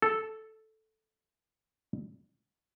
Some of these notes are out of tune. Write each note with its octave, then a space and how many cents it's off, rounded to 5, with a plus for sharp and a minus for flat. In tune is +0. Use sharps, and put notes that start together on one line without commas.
A4 -5